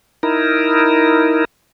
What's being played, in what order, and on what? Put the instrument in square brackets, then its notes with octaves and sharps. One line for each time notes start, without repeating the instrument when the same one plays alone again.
[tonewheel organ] D#4 E4 A#4